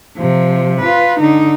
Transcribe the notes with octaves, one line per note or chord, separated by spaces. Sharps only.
C3 F3
F4 B4
D3 D#4